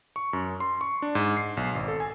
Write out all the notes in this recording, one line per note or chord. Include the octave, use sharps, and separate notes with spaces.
C#6
F#2
C6
C#6
D4
G#2
C7
B1
G#1
A4
G#5